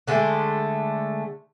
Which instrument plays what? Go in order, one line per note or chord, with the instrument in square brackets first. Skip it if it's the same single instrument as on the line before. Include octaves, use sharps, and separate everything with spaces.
[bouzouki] D3 G#3 A3 G5